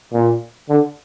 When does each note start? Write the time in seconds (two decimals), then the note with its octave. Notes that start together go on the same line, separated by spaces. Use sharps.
0.12 A#2
0.69 D3